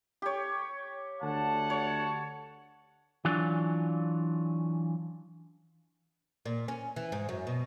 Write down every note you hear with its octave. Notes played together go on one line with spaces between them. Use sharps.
G4 C#5
D2 F#5 A5
C#5
E3 F#3 C#4 D4 F4
A#2
C#4
E3
G#2
F#2
B2